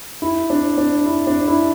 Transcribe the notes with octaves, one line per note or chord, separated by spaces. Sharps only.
E4
D4
D4
E4
D4
E4